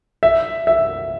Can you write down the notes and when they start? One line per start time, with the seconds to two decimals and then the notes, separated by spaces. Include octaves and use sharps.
0.23 E5
0.67 E5